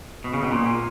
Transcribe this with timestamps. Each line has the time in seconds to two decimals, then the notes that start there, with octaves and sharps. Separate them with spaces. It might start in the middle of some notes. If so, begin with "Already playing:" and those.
0.24 B2
0.33 C#3
0.43 B2
0.52 A#2